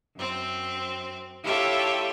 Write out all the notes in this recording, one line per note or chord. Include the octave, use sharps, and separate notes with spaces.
F#2 C4
E4 F4 G4 A4 C#5 E5